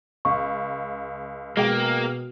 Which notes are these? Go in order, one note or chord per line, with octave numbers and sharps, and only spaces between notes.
C#2 C#6
B2 G#3 A#3 G5 D7